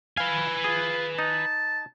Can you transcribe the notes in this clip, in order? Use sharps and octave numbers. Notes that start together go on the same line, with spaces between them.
B4 F5 G#5
F4 G#4
D#4 A5